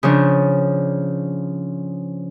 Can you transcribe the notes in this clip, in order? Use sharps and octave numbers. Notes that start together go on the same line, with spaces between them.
C#3 F3 D4